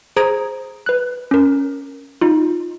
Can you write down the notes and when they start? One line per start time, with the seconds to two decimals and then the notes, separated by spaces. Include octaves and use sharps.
0.16 G#4 C5 A#5 D#6 G#6 D7
0.86 B4 F#6
1.31 C#4 A#4
2.21 D#4 F4